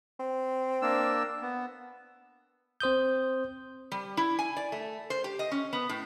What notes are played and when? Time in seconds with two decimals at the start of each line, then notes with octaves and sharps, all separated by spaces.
0.20 C4
0.82 A#3 D4 E6
1.42 B3
2.80 C4 C5 D#6 G6
3.92 G3
4.17 E4
4.39 G#5
4.57 D5
4.72 A3
5.10 C5
5.24 G4
5.39 D#5
5.52 C#4
5.73 B3
5.89 A2